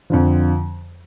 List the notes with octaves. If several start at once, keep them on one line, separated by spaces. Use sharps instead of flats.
F2 D3 F3